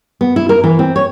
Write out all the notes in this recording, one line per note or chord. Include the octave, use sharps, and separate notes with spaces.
B3
E4
A#4
E3
C4
C#5